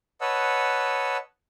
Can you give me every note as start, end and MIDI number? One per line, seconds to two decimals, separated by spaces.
0.21 1.17 71
0.21 1.17 73
0.21 1.17 75
0.21 1.17 78
0.21 1.17 81
0.21 1.17 88